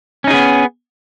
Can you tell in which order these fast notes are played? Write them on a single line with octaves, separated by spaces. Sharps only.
C#4 D#4 G#4 B3